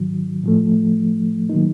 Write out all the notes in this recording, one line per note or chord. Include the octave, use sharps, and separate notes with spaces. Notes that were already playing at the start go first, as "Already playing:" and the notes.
Already playing: G#2 D#3 F#3
A2 F3 A3
D#3 F#3 A#3 D#4